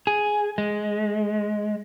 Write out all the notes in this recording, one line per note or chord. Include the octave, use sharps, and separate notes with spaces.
G#4
G#3